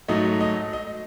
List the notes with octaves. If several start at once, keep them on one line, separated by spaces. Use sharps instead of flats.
G#2 F#3 A3 D#5
D#5
D#5